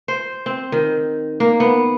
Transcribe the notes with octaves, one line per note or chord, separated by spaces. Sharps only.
C5
C4
D#3
A#3
B3